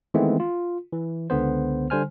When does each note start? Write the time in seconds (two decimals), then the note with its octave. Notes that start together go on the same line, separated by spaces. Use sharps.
0.14 D#3 E3 G#3 A3 B3 C4
0.40 F4
0.92 E3
1.30 C#2 D3 B3 C5
1.90 D3 G3 C5 G#5 F6